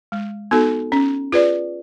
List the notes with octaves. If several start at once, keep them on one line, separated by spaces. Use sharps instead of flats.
G#3
B3 D#4 F#4 A4
C#4
F4 G#4 B4 D5